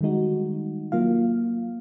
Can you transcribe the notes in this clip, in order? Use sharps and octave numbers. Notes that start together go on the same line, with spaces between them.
D#3 G3 G#3 D#4 F#4
F#3 A#3 F4 F5